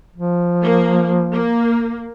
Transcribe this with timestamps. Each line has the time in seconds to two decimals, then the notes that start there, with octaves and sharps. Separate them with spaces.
0.16 F3
0.62 A#3
1.32 A#3